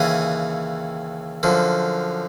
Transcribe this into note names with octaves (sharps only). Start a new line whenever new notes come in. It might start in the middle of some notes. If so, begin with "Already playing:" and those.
Already playing: D#2 C#3 E3 F#5 G#5
F#2 D3 F3